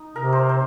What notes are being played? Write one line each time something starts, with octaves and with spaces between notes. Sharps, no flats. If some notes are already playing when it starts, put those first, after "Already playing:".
Already playing: D#4
C3 A#4
C5
C5